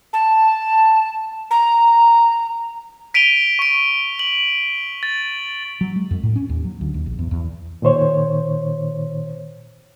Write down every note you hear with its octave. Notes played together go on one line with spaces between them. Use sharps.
A5
A#5
B6 D7 D#7 F7 G7
C#6 D7
F#7
A6
F#3
G#3
F2
A2
C#4
D#2
F#3
D2
D#2
A#1
E2
E2
A#2 D#3 C5 C#5